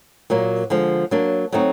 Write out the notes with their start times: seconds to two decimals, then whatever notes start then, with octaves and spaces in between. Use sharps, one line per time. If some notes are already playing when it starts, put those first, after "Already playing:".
0.30 A#2 F#3 A#3
0.70 D3 F3 G#3
1.11 F#3 A#3 D4
1.52 F#3 A3 C4 D#4 F#4